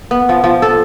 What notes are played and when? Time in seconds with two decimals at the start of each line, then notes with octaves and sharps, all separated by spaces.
0.11 B3
0.29 F3
0.44 F3
0.62 A4